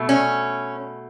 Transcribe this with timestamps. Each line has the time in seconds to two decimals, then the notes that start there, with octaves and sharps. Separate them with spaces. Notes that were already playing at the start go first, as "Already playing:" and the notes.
Already playing: B2 A3
0.09 C#4